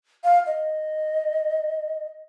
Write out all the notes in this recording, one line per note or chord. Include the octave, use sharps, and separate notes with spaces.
F5
D#5